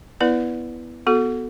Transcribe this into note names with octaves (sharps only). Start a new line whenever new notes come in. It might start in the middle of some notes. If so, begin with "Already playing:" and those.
B3 E4 B4 D5
B3 F#4 A4